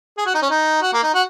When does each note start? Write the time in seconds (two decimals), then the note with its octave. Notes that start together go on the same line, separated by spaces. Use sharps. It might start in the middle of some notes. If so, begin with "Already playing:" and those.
0.18 G#4
0.26 F#4
0.34 D#4
0.42 C#4
0.51 D#4
0.82 F#4
0.93 A#3
1.03 D#4
1.14 F#4